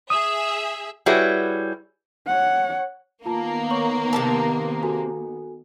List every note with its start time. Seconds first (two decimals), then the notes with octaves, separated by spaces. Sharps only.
0.10 G#4 E5 D#6
1.06 G3 E4 F#4 G#4 B4 C#5
2.27 C#5 F#5
3.26 D#3 A#3 B3 F4 A5
3.70 C#5 C#6 F#7
4.13 C3 C#4 A#4 A5
4.83 F#4 A4 G#5